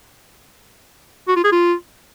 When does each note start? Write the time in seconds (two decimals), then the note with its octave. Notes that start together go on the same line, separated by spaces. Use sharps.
1.28 F#4
1.36 F4
1.44 G#4
1.52 F4